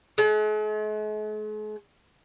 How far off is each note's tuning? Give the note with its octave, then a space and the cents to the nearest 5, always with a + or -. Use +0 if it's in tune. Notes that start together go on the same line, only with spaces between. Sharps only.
G#3 +45